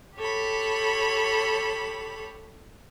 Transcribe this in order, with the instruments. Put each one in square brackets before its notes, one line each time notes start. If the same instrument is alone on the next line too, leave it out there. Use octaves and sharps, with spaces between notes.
[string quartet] G4 A4 C#5 B5